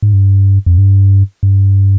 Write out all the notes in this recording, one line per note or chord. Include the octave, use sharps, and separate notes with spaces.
G#2
G2
F2
G2
G2